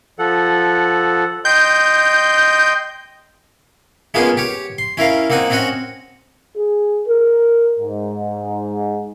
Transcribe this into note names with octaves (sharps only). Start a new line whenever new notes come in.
F3 A4 F#5
D#5 G5 C6 G6
G#3 A#3 B3 C#4 F4 G#4
G4 C#5
C6
C#4 E4 A#4 F5
A#3 C4 D#4 F#5 G#5
C4 C#4 F#4 D#5 F#5
G#4
A#4
G#2